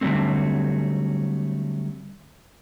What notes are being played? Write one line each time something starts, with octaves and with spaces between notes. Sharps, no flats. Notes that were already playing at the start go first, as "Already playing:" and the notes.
D3 F#3 G3 A3 C4